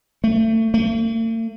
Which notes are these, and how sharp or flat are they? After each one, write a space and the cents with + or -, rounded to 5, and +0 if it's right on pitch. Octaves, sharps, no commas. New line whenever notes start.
A3 +30
A3 +45